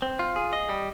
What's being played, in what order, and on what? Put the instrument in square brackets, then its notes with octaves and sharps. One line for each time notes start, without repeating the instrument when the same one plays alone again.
[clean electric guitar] C4
F4
G#4
D#5
G3